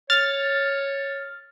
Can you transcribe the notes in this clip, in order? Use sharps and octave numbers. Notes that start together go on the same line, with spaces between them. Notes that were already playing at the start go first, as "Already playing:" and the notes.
C#5 F6 A6